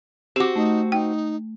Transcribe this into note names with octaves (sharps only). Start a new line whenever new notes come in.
C4 F#4 G4 D6
A3 D#4
D#4 G5